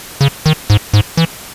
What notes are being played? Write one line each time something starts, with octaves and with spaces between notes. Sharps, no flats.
C#3
D#3
G#2
G#2
E3